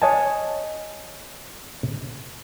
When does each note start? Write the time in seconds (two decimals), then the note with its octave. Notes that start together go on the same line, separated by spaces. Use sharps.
0.02 C#5 D#5 G#5 A5